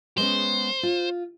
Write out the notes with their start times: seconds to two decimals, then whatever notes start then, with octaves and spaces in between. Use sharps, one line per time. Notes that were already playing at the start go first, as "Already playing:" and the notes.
0.18 G#3 B3 C#4 C5
0.83 F4